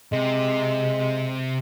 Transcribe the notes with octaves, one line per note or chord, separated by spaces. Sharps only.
C3 G#3